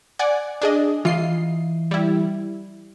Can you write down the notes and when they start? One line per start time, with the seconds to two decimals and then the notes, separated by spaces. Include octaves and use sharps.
0.19 D5 F#5 G#5
0.62 D4 G#4 D#5
1.05 E3 F4 D#5 C7
1.91 G3 E4